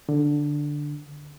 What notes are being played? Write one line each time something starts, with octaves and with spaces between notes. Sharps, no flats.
D3